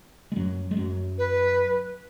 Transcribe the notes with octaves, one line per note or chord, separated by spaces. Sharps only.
G#3
F#2 F#3
G#3
F#2 F#3
B4